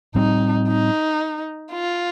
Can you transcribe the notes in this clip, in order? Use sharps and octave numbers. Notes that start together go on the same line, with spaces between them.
A2 G3 C4 D#4
D#4
F4